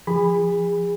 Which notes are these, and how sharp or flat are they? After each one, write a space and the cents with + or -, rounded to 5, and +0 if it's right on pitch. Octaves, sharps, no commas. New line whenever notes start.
F3 -20 G#4 -30 B5 +5